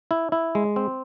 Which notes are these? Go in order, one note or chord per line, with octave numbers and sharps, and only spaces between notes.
E4
E4
G#3
C4